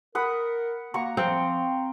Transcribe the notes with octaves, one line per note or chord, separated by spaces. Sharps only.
A#4 F#5 B5 D#6
A#3 F#4 A#5 C#6
F3 C4 F5 G5